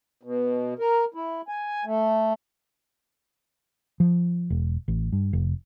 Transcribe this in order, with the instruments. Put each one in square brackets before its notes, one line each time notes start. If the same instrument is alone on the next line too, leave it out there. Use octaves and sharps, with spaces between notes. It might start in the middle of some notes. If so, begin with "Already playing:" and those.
[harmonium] B2
A#4
E4
G#5
A3
[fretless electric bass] F3
E1
A1
G2
F1